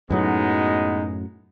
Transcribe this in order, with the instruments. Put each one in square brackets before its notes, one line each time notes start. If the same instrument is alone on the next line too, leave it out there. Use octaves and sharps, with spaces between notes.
[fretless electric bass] F#2 A2 F#3 [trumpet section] G#3 B3 D#4